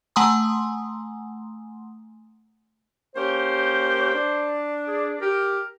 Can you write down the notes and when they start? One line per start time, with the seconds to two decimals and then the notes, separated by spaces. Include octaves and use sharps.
0.16 A3 F#5 G#5 A#5 C6 D#6
3.16 A#3 C#4 G4 C5
4.13 D4
4.87 G#4
5.20 G4 A#4